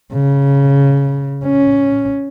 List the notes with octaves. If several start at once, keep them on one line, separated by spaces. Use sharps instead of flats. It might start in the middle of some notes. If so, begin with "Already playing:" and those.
C#3
C#4